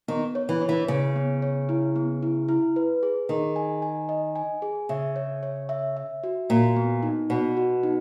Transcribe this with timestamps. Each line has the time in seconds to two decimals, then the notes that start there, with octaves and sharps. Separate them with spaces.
0.08 D#3 B3
0.35 C#5
0.49 E3
0.62 C#5
0.69 E3
0.88 C#3 C#5
1.16 B3
1.42 C#5
1.69 E4
1.96 B3
2.23 E4
2.49 E4
2.76 B4
3.03 G#4
3.29 D#3 G#4
3.56 G#5
3.82 G#5
4.09 D#5
4.36 G#5
4.62 G#4
4.89 C#3 E5
5.16 C#5
5.43 C#5
5.69 E5
5.97 E5
6.24 F#4
6.50 A#2 F#4
6.76 B3
7.03 D#4
7.30 B2 B3
7.57 F#4
7.83 D#4